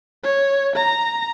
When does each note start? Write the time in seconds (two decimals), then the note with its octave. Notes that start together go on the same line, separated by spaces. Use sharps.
0.23 C#5
0.76 A#5